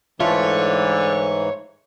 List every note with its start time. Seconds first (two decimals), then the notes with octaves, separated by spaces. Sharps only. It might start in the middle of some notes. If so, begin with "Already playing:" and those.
0.20 G#2 D3 E3 A3 F4 C#5